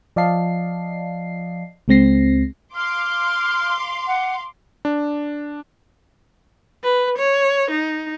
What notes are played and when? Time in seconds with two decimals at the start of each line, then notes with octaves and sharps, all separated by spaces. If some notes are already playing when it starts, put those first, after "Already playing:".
0.16 F3 D5 D#5 F5 A5 C7
1.88 C#2 G#3 C4 A#6 C7
2.76 F5 C6 D6 F6
4.07 F#5
4.85 D4
6.84 B4
7.18 C#5
7.71 D#4